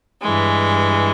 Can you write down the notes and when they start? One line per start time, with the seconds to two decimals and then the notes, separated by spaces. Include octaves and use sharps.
0.22 G2 E3 G#3